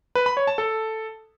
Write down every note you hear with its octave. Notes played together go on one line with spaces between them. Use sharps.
B4
B5
C#5
A5
A4